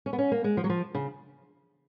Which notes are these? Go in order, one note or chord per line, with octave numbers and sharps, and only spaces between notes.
C#4
B3
C#4
A#3
G#3
F3
F#3
F3
C#3